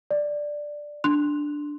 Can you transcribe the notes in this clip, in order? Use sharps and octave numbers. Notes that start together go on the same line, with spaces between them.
D5
D4 C6 F#6 F7